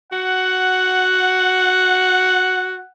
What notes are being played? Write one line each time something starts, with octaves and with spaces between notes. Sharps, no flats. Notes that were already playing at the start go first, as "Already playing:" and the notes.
F#4 F#5